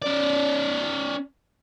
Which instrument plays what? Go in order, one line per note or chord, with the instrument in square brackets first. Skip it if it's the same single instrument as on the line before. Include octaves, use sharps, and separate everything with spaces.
[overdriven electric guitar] C#4 D5